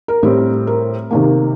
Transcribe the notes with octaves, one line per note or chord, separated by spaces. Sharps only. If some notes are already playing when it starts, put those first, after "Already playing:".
A#4
A2 G3 C4
A#4
C3 D#3 A#3